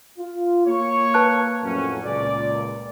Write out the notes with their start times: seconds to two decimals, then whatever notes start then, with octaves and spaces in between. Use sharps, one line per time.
0.19 F4
0.67 A#3 C#5 C#6
1.14 B4 A5 F#6
1.64 F2 A2 F#3 C#4
2.04 C#2 A#2 D5